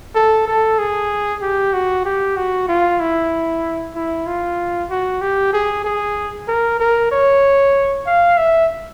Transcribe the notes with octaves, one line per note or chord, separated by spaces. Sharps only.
A4
A4
G#4
G4
F#4
G4
F#4
F4
E4
E4
F4
F#4
G4
G#4
G#4
A#4
A#4
C#5
F5
E5